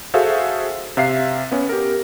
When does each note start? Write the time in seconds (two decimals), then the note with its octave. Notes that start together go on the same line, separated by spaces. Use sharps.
0.14 F#4 G#4 A4 C5 E5 F5
0.97 C3 E5 F5 C7
1.52 B3 C#4
1.69 G4 A#4